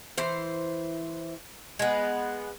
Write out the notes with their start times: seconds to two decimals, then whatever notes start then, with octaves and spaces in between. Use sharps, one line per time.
0.18 E3 C5
1.79 G#3 B3